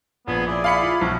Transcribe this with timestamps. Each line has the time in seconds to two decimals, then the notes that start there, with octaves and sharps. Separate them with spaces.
0.27 A#1 B3 G#4 C#5 C6
0.47 E4 G#4 D5
0.64 F5 B5 C#7
0.82 F4
1.01 B1 C#4 D4 G#4 C5